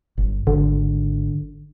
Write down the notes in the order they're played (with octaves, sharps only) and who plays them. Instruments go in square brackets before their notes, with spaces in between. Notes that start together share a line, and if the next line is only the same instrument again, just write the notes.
[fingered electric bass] G1
[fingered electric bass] G#1 [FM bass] D3